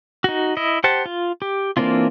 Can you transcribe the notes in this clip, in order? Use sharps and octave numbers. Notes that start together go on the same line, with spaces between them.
D#4 F#4
E4 D#5
G4 C5 F#5 A5
F4
G4
E3 A#3 C4 D4 F4